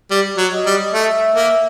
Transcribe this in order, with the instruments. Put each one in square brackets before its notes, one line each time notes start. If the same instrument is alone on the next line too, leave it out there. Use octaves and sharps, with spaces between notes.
[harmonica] G3
F#3
[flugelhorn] D#5
[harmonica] G3
[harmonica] A3 [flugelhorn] E5
[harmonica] A#3